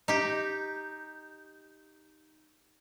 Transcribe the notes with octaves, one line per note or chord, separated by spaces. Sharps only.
D#4 G4